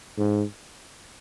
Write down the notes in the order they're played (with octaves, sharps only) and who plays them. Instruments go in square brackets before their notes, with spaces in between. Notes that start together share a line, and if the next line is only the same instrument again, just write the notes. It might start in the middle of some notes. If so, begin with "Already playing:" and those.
[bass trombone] G#2